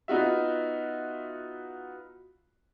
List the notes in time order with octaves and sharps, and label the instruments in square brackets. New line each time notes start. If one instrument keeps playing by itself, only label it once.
[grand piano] B3 D#4 F4 F#4 E5